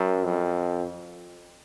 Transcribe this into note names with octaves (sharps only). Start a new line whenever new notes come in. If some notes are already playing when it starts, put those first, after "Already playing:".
Already playing: F#2
F2